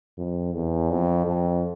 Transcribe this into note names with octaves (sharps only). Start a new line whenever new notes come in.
F2
E2
F2
F2